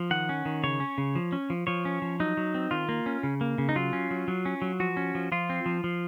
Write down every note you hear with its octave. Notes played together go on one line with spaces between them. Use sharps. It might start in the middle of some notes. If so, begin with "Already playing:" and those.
Already playing: F3
D#3 F#5
C#4
D#3
C#3 C#5
C#4
C#3
F3
C#4
F3
F3 C#5
C#4
F3
F#3 D#4
F#3
C4
D#3 F4
A#3
C#4
C#3
A#3
C#3
D#4
F#3 F4
C#4
F#3
F#3
C#4
F#3
F3 F#4
C#4
F3
F3 F4
C4
F3
F3